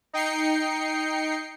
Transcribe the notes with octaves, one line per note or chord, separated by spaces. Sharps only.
D#4 G5 C7 C#7